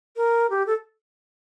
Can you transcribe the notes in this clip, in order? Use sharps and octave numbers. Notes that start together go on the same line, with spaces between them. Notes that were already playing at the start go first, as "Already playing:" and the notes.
A#4
G4
A4